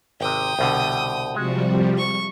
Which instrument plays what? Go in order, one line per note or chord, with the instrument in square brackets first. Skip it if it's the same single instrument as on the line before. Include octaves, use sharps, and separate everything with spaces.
[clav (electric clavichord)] G#1 C3 [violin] G5 D#6
[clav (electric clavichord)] C2 B2 D3
[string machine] C3 F3 G3 [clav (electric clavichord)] G#3 [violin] F#4
[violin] C#6